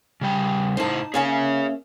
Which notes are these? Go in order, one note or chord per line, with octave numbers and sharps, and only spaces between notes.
C#3 G3 G5
A2 D#4 E4 C5 A5
A#3 C#4 G#4 C#5 E5 G#5